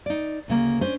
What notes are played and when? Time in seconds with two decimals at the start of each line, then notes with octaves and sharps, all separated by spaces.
0.06 D#4 D5
0.48 D2 C#3 A#3
0.81 C#4 D4 C5